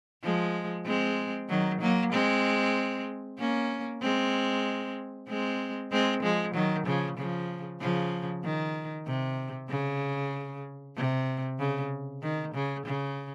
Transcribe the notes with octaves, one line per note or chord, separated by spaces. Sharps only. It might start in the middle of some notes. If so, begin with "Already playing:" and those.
F3 G#3
G#3 C4
D#3 F#3
F#3 A#3
G#3 C4
A#3 C#4
G#3 C4
G#3 C4
G#3 C4
F3 G#3
D#3 F#3
C#3 F3
C#3 F3
C#3 F3
D#3
C3
C#3
C3
C#3
D#3
C#3
C#3